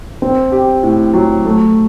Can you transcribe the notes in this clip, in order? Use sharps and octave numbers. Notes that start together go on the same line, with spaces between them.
C4
G4
A2
F#3
A3